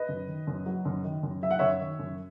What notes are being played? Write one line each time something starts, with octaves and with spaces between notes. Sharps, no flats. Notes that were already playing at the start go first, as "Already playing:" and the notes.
Already playing: B4 D#5
F#2
D#3
F#2
F#3
F#2
D#3
F#2
F#3 E5
F#5
F#2 C#5 E5
D#3
F#2